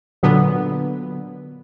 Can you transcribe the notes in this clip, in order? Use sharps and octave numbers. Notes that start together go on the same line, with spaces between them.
A#2 D3 F#3 B3